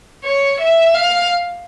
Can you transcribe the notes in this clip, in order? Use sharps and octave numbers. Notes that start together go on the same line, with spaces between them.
C#5
E5
F5